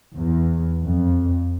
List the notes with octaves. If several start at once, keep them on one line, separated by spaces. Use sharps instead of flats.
E2
F2